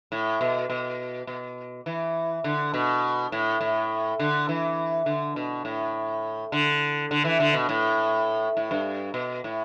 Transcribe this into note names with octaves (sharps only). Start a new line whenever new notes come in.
A2
B2
B2
B2
E3
D3
B2
A2
A2
D3
E3
D3
B2
A2
D3
D3
E3
D3
B2
A2
A2
G2
B2
A2